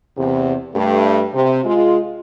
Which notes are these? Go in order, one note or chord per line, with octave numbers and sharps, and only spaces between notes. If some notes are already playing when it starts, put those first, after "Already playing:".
E2 C3
G2 A3
C3
G#3 F4